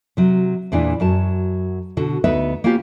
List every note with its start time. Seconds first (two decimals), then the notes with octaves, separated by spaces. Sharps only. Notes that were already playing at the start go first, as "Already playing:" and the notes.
0.17 C3 F#3
0.72 E2 A#2 E3 D4
1.00 F#2 F#3 A5
1.97 B2 D3 F#4
2.24 D2 B3 D#4 B4 E5
2.64 A#3 B3 C#4 F4 G4